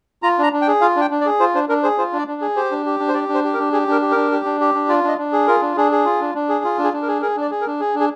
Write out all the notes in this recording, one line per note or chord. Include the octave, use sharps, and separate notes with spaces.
F4 A#5
D4 A#5
D4
G5
G#4
F4 F5
D4 G5
D4
D5
G#4
F4 C5
D4 C5
D4 A#4
G#4 C5
F4 C5
D4
D5
D4
G#4
G4 C5
D4
G4
D4
C5
G4 D5
D4
C5
G4
A#4
D4
G4 G#4
D4 A#4
G4
D4 A#4
G4
D4
G4
D4
F4 D5
D4 D#5
D4
G#4
F4 A#4
D4
D4 G#4
G#4
F4
D4
D4
G#4
F4
D4
G#4
D4
A#4
G#4
G#4 A#4
D4 D5
G#4
A#4
D4
G#4
D4
G#4